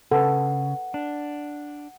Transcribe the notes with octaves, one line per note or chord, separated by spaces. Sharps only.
C#3 A4 B4 F#5
D4